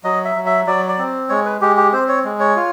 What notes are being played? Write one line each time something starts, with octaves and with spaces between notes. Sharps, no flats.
F#3 D#5
E5
F#3
E5
F#3 D5
D5
C4
G#3 C#5
B4
G#3 G4
G4
C4 C5
C#5
G#3
C#5
F4